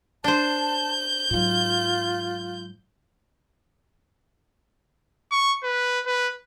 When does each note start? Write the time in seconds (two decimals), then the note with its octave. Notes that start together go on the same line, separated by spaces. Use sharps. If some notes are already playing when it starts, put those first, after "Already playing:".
0.24 D4 C5 A5 G6
1.30 G#2 F#3 F4
5.32 C#6
5.64 B4
6.06 B4